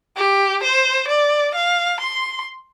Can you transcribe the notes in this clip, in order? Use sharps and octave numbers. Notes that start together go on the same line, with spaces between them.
G4
C5
D5
F5
C6